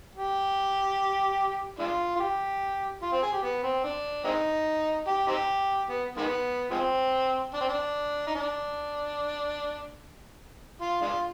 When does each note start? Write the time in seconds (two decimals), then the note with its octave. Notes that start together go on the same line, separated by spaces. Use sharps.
0.15 G4
1.79 G#3 D4 F4
2.16 F4
2.20 G4
3.02 F4
3.12 C4
3.23 G#4
3.33 G4
3.43 B3
3.63 C4
3.84 D4
4.24 G#3 C4 D#4
5.07 G4
5.28 C4 D#4 G4
5.89 B3
6.17 D#3 G#3 B3
6.71 F3 G#3 C4
7.53 D4
7.61 C4
7.68 D4
8.27 D#4
8.35 D4
10.81 F4
11.02 G#3 D4 F4